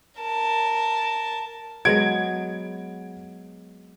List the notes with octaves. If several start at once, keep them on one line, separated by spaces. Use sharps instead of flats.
A#4 A5
F#3 G#3 B3 G#6 D7